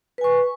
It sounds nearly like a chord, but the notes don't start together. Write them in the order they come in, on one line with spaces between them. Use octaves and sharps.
B4 G#5 C#6